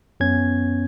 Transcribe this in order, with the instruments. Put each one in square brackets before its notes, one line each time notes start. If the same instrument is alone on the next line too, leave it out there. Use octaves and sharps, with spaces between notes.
[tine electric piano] F#2 B3 C#4 G#6